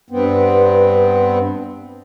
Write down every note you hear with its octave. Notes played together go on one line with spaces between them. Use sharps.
G2 B3 C4